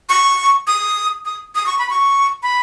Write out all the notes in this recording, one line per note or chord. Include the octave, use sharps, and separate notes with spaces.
C#6
D#6
D#6
D#6
C#6
B5
C#6
B5